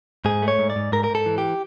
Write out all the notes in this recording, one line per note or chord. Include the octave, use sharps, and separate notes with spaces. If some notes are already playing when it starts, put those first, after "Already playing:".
G#2 G#4
A3
C#5
G#2
D5
G#2
G#2 A#4
A#4
G#2
A4
E3
G4